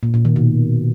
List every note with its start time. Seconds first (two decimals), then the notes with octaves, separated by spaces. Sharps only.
0.03 A#2
0.14 A#2
0.25 D#3
0.36 B2